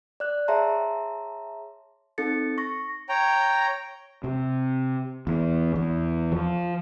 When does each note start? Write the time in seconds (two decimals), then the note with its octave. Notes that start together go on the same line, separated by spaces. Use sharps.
0.20 D5 F#6
0.48 G#4 C#5 E5 A5 A#5 C6
2.18 C4 D#4 A4 A6 C#7
2.58 C#6 A#6
3.09 C#5 G5 A#5
4.24 C3
5.27 E2
5.76 E2
6.32 F3